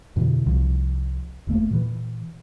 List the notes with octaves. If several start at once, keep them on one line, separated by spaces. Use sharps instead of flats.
F2 B2 D3 E3
C2 F3
F#1 E2 A3 A#3
A#2 E3